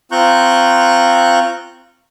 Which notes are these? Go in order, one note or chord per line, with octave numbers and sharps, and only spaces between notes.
C4 F4 A#5 C#6 F#6 G6